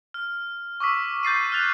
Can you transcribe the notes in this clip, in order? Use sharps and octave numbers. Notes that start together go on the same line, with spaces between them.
F6
C#6 D6 E6 B6
G6 A6 C7 D#7
F6 F#6 A6 F7